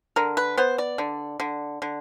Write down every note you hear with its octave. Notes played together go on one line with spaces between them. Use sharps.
D3 A#4
B4
B3 C5
D5
D3
D3
D3